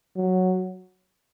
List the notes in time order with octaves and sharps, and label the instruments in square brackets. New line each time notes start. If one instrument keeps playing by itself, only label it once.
[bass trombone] F#3